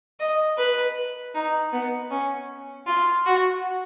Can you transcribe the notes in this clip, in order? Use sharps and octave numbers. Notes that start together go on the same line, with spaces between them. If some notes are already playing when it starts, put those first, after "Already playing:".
D#5
B4
D#4
B3
C#4
F4
F#4